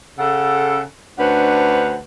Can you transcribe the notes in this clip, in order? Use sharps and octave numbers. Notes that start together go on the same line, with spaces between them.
C#3 A4 F#5
D2 C#4 D4 B4 C5 F#5